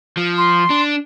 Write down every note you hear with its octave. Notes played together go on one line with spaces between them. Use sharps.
F3
C6
D4